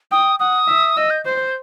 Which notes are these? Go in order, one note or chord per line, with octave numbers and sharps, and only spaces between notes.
G5 D#6
F#5 D#6
E5
D#5 E6
G6
C5 G6